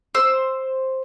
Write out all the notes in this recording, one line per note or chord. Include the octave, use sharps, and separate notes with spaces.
C5 E6